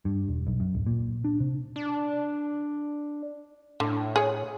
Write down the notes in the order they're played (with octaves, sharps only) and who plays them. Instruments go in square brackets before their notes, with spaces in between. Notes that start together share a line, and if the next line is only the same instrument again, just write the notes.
[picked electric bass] G2
E1
B1
F#2
D1
A#2
D4
C3
[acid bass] D4
[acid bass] A2 [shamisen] D3
[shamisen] G#4 C#5